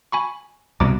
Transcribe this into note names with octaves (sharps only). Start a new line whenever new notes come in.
G#5 B5 C#6
C2 B2 A#5 D6